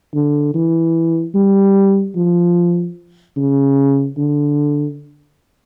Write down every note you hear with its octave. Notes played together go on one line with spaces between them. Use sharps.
D3
E3
G3
F3
C#3
D3